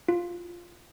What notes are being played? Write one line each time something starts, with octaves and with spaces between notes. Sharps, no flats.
F4